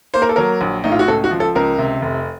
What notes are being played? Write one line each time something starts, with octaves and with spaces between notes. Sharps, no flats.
A#3 C5
A#4
A4
F#3 A#4
A#1
A2 D#4
F4
F#4
C#2 A4
F#4
F3
A4
C#2 A#4
C3
F1